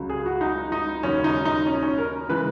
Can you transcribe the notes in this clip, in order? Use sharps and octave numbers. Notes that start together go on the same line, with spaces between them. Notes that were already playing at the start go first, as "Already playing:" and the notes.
Already playing: C#2 C#3 F#3
G#4
F#4
D#4
D#4
D#2 C#3 F#3 C#4
D#4
D#4
C#4
C#4
A#4
C#3 E3 G#3 B4